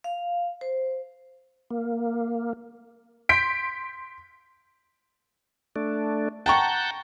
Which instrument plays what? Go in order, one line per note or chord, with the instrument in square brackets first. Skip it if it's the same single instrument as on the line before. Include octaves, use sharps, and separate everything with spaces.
[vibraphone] F5
C5
[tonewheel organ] A#3
[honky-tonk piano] C6 G6 B6 D7
[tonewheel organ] A3 D4
[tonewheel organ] F#5 A5 G6 [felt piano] G5 A#5 C#6